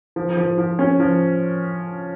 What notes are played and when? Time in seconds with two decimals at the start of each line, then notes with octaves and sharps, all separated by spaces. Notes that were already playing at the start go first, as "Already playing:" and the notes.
0.16 F3
0.37 F3
0.58 F3
0.79 C#4
1.00 F3